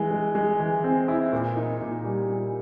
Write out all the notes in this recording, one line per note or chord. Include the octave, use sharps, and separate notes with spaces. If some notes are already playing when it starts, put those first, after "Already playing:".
Already playing: E3 G#3
G#3
G#3
E3
C4
E4
A#2
D#4
A#2
G3
A#2